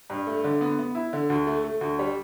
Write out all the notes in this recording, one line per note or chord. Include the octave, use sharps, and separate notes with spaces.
G2
A3
D3
B3
B3
E4
D3
D2
A3
A3
D2
G3